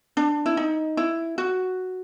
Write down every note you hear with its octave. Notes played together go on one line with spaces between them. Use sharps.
D4
E4
D#4
E4
F#4